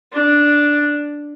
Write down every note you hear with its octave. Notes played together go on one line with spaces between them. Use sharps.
D4